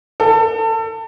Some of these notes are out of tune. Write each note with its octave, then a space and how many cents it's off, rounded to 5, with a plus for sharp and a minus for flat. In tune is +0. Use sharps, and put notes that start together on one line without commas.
A4 +30